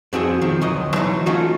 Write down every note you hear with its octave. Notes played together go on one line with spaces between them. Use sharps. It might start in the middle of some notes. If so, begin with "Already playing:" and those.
F2 C4 F#4 G#4
D#3 F3 C4
D2 F#3 D#5
E3 F#3 D#4
A3 C#4 D#4 F4 F#4